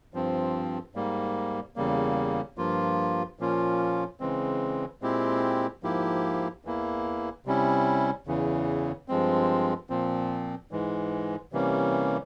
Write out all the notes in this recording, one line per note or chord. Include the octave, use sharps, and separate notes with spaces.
G2 F3 C4
G#2 G3 A#3
E2 C#3 G3 A#3
G2 F3 A#3 F4
A#2 F3 A#3 C#4 F4
C#3 E3 G#3 C4
A#2 G#3 C4 E4 G4
G#2 F3 A#3 E4 G4
E2 E3 A#3 E4
C3 G3 C#4 E4
E2 C#3 E3
G2 F3 G#3 C4
A#2 F3 C4
G#2 E3 G#3
C3 E3 G3 A#3 C#4